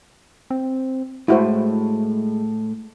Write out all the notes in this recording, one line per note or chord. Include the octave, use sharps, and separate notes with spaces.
C4
A2 G#3 E4 F#4 C5